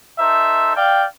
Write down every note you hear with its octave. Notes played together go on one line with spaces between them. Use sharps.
D#4 A4 C5 E5
D5 F5 G5